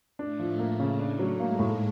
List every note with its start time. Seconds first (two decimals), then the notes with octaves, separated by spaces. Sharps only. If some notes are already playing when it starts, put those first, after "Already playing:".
0.19 A2 A3 D4
0.40 F3
0.59 A2 A3 A#3
0.80 C#3
1.00 D4
1.19 F#3
1.39 G#2 G#3 A#3
1.59 A2